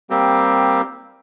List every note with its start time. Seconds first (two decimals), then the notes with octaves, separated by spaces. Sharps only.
0.10 G3 A#3 C4 G4